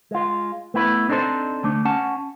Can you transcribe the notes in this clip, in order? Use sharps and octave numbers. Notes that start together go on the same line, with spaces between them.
G#3 F4
A3 B3 E4 B4
C4 D4 D#4 F4 A4 C5
D2 A3 D4
C#4 F#5 A5